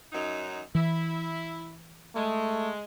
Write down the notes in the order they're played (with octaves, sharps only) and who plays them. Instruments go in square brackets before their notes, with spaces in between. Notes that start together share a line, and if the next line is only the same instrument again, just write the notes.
[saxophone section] F#2 F#3 D#4
[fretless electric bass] E3 [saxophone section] E4
[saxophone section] G#3 [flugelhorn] A3